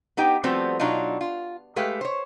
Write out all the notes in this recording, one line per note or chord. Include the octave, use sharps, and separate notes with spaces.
B3 D#4 G4 G5
F3 G3 A3 B3 C4 F#4
B2 F#3 D4 D#4 F4
F4
G#3 A3 G4 B4 F5
C5 C#5